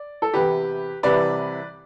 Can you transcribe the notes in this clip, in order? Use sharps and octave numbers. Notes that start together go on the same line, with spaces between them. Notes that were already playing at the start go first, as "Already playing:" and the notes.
Already playing: D5
A4
E2 C3 E3 G4 B4
C2 C3 E3 B4 D5